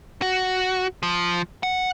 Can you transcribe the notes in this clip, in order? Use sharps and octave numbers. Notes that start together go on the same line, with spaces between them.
F#4
F3
F#5